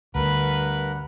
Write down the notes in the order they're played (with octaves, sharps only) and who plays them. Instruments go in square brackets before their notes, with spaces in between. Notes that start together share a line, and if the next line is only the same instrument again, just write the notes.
[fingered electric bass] D2 [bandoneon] G2 A#4 F#5 [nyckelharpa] B4